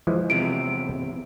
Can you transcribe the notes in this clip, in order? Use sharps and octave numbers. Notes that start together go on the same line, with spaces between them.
E3 F3 G#3
E2 C3 D7